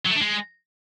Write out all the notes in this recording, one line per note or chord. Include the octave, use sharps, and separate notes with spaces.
F#3
A3
D4
G#3